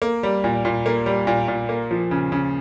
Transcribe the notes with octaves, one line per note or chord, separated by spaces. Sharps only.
A#3
G3
A#2
A#2
A#3
G3
A#2
A#2
A#3
F3
C#3
C#3